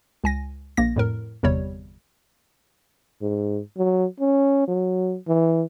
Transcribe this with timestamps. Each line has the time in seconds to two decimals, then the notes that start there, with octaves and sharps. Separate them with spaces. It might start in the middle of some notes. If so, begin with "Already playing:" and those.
0.24 C#2 G#5 A#6
0.77 A#1 A#3 A#6
0.96 F2 A2 A#4
1.43 G1 E2 C3 G3 C#5
3.22 G#2
3.78 F#3
4.20 C#4
4.68 F#3
5.28 E3